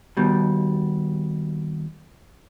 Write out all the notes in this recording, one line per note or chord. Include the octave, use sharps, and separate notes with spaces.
D#2 B2 G3